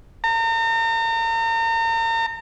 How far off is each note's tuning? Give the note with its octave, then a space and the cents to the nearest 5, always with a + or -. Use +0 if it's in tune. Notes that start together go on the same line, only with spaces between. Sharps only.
A#5 -40